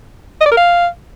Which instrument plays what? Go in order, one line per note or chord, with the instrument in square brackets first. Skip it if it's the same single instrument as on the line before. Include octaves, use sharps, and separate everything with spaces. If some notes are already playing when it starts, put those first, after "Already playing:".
[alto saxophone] D#5
D5
A#4
F5